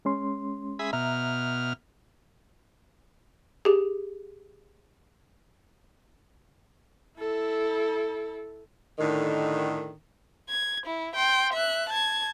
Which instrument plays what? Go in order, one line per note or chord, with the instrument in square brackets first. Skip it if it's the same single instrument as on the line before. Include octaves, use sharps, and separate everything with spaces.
[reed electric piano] G#3 C#4 C6
[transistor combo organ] G#4 E5 B5
[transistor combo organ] B2 F6 [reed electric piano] E5 A#5
[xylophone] G4 G#4
[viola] E4 A4
[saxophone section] A2 D3 D#3
[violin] G#6
E4
G5 C6
E5 F#6
A5 G#6